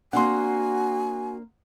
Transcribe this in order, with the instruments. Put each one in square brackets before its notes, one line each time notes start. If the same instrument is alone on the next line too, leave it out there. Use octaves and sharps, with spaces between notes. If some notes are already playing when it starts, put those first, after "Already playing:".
[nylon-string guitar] A#3 C4 D4 [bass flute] F#4 [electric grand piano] F#5 C6 [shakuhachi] G#5